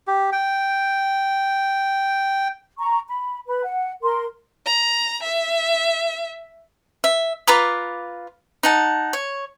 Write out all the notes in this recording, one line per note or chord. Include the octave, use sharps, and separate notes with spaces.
G4
G5
A#5 C#6
B5
B4 B5
F#5
A#4 C6
A#5
E5
E5
F4 B4 A#5 D6
D#4 F#5 A5
C#5